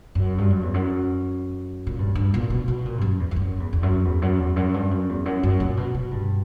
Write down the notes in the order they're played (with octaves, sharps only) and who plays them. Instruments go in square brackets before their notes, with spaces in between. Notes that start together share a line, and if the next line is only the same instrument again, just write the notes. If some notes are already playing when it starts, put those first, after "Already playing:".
[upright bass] F#2
G2
F#2
E2
F#2
A#2
G2
G2
A#2
B2
B2
A#2
G2
F#2
E2
E2
F#2
E2
E2
F#2
E2
F#2
E2
F#2
G2
F#2
E2
F#2
F#2
A#2
B2
B2
G2